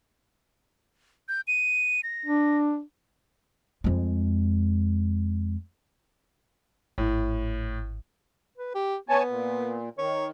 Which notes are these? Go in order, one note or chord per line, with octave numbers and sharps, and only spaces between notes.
G6
D#7
A#6
D4
F2 G#3
G#1 A2
B4
G4
B3 C#5 G#5 A5
A#2
D#3 C#5